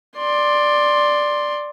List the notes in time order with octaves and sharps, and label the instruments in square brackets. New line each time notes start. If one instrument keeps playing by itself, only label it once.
[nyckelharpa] D5 C6